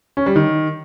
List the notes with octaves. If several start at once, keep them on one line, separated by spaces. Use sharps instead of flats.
C#4
G3
D#3